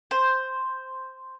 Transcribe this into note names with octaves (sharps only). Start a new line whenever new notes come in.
C5